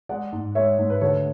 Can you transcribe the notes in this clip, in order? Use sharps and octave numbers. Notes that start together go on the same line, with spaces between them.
G#3 D5 F#5
G#2
G#3 C#5 E5
G#2
B4
D2 A4 C#5